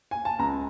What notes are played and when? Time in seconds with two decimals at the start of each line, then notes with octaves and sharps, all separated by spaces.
0.11 G#5
0.25 A5
0.39 C#2 A#5